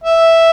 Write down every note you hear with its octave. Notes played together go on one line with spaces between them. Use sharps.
E5